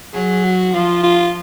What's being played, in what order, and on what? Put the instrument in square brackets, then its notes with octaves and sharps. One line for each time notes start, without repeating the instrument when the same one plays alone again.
[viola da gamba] F#3 [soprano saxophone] G#4
[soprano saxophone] F#4
[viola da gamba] F3 [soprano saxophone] F4
[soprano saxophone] F4